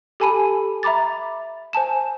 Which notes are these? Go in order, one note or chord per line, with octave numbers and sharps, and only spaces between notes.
G4 A4 G#5 A5 B5 D#7
E5 A#5 B5 D6 A6
C5 G#5 A5 E7